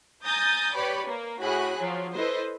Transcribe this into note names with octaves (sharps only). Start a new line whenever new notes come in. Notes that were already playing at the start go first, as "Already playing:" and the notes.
G#5 A#5 D#6 G6 A6
G4 B4 C#5 D5 B5
A#3
A2 F#4 G#4 B5 F#6
F3 F#3
E4 A4 B4 C5 D#5